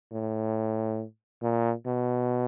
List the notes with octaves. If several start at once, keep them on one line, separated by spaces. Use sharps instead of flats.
A2
A#2
B2